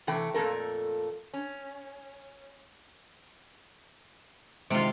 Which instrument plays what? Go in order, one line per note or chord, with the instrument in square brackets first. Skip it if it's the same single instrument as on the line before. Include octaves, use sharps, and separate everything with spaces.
[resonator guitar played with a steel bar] C3 E3 A3 G5
F2 A#2 A3 A4 A#4
C#4
[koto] C3 F4 [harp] D#3 G#3